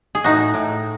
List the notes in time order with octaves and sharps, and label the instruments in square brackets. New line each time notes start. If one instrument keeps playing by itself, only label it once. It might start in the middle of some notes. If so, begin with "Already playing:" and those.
[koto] G#4
A2 D#4 F#4
A2